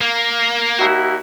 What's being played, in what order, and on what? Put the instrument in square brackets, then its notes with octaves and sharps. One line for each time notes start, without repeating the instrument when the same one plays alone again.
[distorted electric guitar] A#3
[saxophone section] D#2 E4 F#4